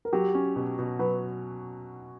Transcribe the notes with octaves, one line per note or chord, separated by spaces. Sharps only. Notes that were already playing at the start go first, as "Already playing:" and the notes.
A#4
F#3 G4
C#4
B2
B2
F#3 B4